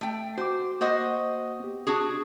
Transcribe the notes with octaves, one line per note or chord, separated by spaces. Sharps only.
A3 G5
F#4 C5 D6
A#3 F#4 C5 D#5 F#5 D#6
B3 G4
D4 F#4 G#4